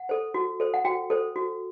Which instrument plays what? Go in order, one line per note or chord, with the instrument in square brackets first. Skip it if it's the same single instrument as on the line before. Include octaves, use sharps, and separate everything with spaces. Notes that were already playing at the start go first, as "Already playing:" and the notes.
Already playing: [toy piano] F#5
A4 C5
F#4
A4 C5
F#5
F#4 G5
A4 C5
F#4